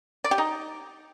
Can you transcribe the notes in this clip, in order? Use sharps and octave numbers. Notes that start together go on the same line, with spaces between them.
D5
G4
D#4